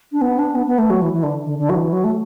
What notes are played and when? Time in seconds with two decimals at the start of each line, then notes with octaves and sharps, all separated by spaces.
0.12 D4
0.21 B3
0.39 D4
0.55 B3
0.66 B3
0.78 A3
0.90 F#3
1.02 E3
1.13 E3
1.23 D3
1.45 D3
1.58 D3
1.69 F#3
1.75 E3
1.92 F#3
2.04 A3